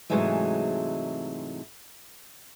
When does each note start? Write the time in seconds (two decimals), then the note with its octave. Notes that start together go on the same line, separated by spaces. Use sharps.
0.10 G#2 C3 E3 F#3 G#3 A3